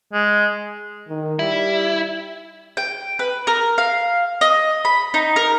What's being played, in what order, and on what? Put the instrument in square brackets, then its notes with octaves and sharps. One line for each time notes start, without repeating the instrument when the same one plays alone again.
[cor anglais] G#3
[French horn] D#3
[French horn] G3 [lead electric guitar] E4
[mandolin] G5
B4
A#4
F5
D#5
B5
D#4
A#4